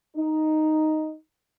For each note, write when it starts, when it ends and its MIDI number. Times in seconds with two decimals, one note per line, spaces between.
0.17 1.14 63